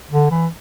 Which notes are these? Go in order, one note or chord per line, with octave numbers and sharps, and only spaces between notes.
D3
E3